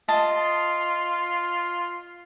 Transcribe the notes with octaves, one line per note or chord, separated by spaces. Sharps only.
F4 D#5 A5